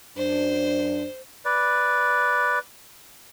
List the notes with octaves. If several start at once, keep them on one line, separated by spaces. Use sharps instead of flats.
F#2 D4 C5
B4 D5